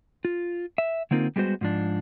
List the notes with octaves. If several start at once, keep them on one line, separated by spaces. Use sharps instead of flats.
F4
E5
D3 A#3 C4 D#4 F4 A#4
G3 G#3 B3 F#4 C5
G#2 F3 D4